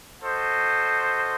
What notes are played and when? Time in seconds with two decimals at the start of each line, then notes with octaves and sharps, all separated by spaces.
0.21 F#4 A4 C5 D#5